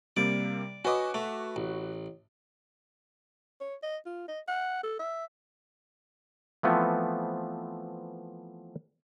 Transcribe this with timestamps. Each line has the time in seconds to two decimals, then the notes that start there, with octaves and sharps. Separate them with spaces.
0.17 C3 G3 A#3 D5
0.85 C#4 F#4 B4 D#5 D6
1.14 A3
1.56 A1
3.61 C#5
3.83 D#5
4.06 F4
4.28 D#5
4.48 F#5
4.84 A4
4.99 E5
6.63 E3 F3 A3 B3 C4